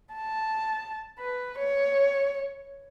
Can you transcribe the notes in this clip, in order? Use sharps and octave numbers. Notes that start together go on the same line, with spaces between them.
A5
B4
C#5